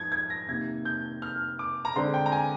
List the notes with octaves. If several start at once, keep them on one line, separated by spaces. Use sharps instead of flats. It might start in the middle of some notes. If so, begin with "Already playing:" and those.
Already playing: G#2 F3 G#6
G#6
A#6
C3 D#3 A#3 G#6
G6
F6
D6
A#5
D3 G#3 C4 C6
G5
A#5
G#5